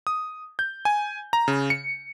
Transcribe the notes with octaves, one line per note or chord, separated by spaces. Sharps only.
D#6
G6
G#5
A#5
C#3
C#7